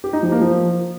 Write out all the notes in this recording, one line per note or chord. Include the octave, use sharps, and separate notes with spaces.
G4
D#4
F3
A#3
F3